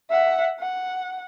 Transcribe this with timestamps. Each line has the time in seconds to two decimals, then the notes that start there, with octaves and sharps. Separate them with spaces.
0.10 E5 F#5
0.59 F#5